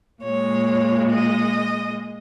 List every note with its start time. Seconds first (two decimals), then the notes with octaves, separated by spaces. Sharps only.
0.23 A#2 G#3 C#5
1.10 D#5